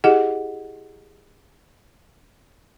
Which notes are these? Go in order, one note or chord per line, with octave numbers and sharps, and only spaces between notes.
E4 G4 G#4 D#5 F#5